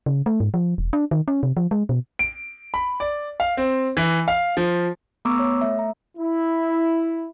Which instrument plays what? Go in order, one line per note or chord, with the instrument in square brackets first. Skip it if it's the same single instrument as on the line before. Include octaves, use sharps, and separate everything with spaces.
[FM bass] C#3
A3
G#2
F3
E1
D4
D#3
C#4
C3
F3
G#3
B2
[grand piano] D7
B5
D5
F5
C4
E3
F5
F3
[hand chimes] A3 B3 A#5 C#6 D6 E6
C#5
A3 E5
A#5
[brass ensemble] E4